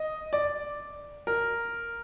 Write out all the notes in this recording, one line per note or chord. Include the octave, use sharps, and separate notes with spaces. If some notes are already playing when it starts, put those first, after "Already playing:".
Already playing: D#5
D5
A#4